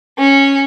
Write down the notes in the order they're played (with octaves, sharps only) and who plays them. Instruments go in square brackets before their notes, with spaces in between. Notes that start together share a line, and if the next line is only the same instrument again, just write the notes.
[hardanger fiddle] C#4